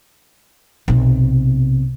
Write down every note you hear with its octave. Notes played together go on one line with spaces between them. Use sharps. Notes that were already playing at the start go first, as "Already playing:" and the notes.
B1 C3